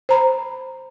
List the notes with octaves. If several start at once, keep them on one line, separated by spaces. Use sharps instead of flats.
C5 A#5 B5